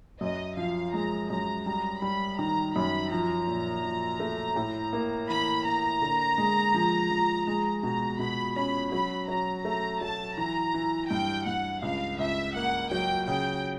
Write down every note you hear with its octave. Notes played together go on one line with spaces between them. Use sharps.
F#2 D#5
F3 F5
G#3 A#5
F#2 A#5
G3 A#5
G3 B5
D#3 A#5
F#2 B5
F3 A#5
A#2
F3
A3
A2
A#3
E3 B5
A#3 A#5
D3
G#3
F3
F3
G#3 A#5
B2 A#5
B2 B5
C#4 B5
F#3 B5
F#3 A#5
A3 A#5
F#3 A5
E3 A#5
E3
G2 G5
G2 F#5
C#2 F5
C#2 E5
A#3 F#5
F#3 G5
C#3 G5